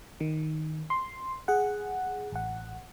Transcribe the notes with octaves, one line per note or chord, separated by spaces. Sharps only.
D#3
C6
G#4 F#5
A1 F#5